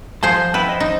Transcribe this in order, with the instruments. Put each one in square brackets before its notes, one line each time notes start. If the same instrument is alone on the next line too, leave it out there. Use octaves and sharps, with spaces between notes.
[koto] F3 G#4 C5 [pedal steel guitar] A5 G6
[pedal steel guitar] B3 E4 G5 [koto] B4
[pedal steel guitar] C5 D#5
[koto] D#4